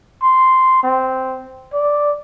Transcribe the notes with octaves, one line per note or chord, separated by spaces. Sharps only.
C6
C4
D5